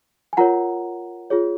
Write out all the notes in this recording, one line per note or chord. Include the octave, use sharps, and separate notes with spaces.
G#5
F4 A#4 C#5 F#5 A#5
F4 G#4 C#5